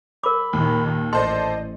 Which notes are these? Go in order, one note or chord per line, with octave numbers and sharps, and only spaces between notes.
A#4 B5 D6
D#2 A#2 D#3
A1 A4 C5 D5 D#5 C6